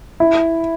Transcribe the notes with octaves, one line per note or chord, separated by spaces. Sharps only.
E4